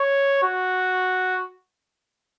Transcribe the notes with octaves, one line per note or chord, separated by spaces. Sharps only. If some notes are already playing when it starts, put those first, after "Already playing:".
Already playing: C#5
F#4